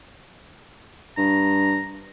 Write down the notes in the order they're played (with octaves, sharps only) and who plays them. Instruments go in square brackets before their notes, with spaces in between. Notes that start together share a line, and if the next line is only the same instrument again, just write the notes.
[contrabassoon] G2 [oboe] A#5